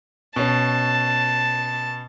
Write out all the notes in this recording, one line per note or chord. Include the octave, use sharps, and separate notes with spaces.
B2 C#4 A5